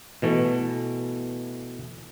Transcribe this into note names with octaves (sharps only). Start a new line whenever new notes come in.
B2 E3 A3